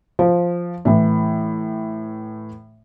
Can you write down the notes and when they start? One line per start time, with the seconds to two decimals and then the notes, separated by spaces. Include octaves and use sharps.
0.19 F3
0.85 A2 E3